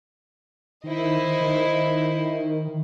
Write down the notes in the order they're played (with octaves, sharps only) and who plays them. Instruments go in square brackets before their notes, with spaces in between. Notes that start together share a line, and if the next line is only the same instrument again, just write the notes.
[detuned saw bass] D#3 [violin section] E4 C5 D#5
[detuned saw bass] D#3